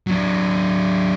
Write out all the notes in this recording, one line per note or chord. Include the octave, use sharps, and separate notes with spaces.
F#3 D4